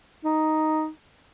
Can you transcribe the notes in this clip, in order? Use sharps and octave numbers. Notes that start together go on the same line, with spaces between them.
D#4